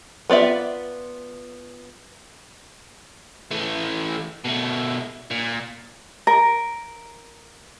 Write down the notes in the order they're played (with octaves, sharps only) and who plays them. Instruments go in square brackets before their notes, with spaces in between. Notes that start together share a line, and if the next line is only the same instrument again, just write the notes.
[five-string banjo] B3 F4 D5 E5
[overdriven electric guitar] E3 A3
B2 A3
A#2
[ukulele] A#4